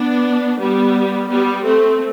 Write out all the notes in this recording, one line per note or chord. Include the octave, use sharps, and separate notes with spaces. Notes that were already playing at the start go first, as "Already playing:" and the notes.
Already playing: B3 D4
G3 B3
G3 B3
A3 C4